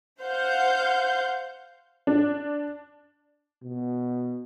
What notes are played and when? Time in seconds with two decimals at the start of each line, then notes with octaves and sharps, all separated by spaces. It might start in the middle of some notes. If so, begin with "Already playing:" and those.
0.21 C5 F5 F#5 G6
2.07 D4
3.63 B2